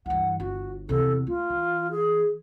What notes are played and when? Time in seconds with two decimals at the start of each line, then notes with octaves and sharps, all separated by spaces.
0.06 G2 E3 F#5
0.40 G1 F#4
0.89 E2 C3 A4
1.27 A3 F4
1.50 E3
1.91 G#4